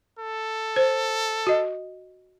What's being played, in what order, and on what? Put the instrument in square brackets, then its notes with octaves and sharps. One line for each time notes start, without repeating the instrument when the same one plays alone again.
[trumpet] A4
[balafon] C5
F#4 D#5